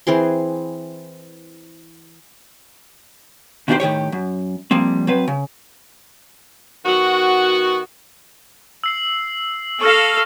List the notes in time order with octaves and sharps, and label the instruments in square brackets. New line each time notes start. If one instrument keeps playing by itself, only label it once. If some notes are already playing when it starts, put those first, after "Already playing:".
[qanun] E3 C4 G#4 C6
[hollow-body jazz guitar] B2 D#3 D4 E4 G4 C5
A2 D#3 G4 C#5
F#2
F3 G3 A#3 C4
F#3 C4 B4
C#3
[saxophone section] D#3 B3 F#4
[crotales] E6 C7 F#7
[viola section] A4 F5 [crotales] C#6 F6 A#6